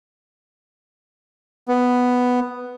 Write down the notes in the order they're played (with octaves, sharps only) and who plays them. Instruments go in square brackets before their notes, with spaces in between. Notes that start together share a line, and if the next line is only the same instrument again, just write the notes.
[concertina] B3